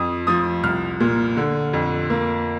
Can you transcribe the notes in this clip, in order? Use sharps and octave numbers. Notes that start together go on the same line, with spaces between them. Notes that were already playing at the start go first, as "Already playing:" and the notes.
Already playing: F2 D#6
F3 D#6
C2 F6
A#2
D3
F2
A#3